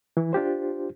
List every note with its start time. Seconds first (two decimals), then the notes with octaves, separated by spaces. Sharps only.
0.17 E3 E4
0.33 D4 F4 G4 C5